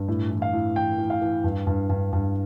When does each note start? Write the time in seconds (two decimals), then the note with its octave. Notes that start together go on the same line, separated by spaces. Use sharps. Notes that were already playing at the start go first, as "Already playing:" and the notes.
Already playing: G2
0.08 A2
0.31 E3
0.42 F5
0.53 A2
0.76 E3 G5
0.98 E3
1.10 F5
1.22 E3
1.44 G2
1.67 G2
1.89 G2
2.13 G2